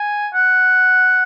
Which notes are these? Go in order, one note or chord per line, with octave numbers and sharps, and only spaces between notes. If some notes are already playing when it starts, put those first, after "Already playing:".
Already playing: G#5
F#5